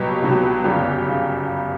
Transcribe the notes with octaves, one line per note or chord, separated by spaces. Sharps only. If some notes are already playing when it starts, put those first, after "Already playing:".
Already playing: C#2 B2 F#3 G3 G4
C#2 B2 F#3
G1 F#2 C#3 G3 G4
C#3